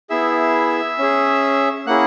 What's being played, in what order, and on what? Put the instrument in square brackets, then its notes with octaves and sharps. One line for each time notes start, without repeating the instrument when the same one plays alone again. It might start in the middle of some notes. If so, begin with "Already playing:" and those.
[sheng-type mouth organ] B3 E4 G#4 E5 E6
C#4 G#4
A#3 C#4 E4 G#4 F#5 F#6